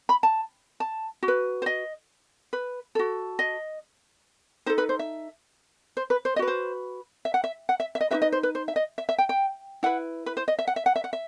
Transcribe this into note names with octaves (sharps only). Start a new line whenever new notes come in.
B5
A5
A5
F#4
B4
C5
D#5
B4
F#4 A4
D#5
D#4 A4 C5
B4
C5
E5
C5
B4
C5
D#5
F#4 B4
C5
E5
F#5
E5
F#5
E5
E5
D#5
D#4 F#4 B4 E5
D#5
C5
B4
C5
E5
D#5
E5
E5
G5
G5
E4 B4 F#5
B4
C5
D#5
E5
F#5
E5
F#5
E5
F#5
E5